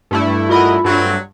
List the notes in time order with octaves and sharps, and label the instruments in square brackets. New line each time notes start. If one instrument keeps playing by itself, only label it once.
[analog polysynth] G2 A3 E4
[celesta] F4 B5 [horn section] F#4 A#4 D#5
[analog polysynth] G2 [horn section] F#3 A3 C4